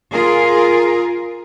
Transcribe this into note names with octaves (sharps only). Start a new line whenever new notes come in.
F4 G#4 A#4